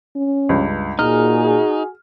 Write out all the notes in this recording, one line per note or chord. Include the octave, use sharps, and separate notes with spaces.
C#4
C#2 G2
A#2 D#4 F#4 G#4 F6